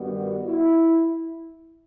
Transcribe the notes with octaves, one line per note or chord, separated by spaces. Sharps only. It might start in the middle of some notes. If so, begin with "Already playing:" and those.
Already playing: G2 D#3 G3 B3 F#4
E4